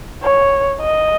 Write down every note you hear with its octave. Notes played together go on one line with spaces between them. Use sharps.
C#5
D#5